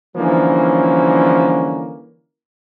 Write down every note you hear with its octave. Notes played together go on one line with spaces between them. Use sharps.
D3 E3 F3 G3 A#3 C#4